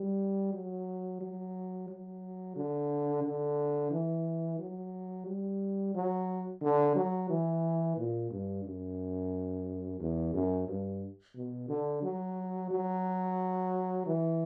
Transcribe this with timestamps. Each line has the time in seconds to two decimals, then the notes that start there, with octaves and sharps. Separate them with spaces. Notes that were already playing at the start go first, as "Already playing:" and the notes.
Already playing: G3
0.53 F#3
1.21 F#3
1.89 F#3
2.56 D3
3.24 D3
3.92 E3
4.59 F#3
5.27 G3
5.95 F#3
6.62 D3
6.96 F#3
7.30 E3
7.98 A#2
8.31 G2
8.65 F#2
10.00 E2
10.34 F#2
10.68 G2
11.36 B2
11.69 D3
12.03 F#3
12.71 F#3
14.06 E3